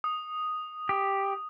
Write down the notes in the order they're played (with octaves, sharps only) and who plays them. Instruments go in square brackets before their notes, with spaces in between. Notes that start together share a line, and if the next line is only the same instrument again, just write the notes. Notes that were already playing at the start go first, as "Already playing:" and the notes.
[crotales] D#6
[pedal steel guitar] G4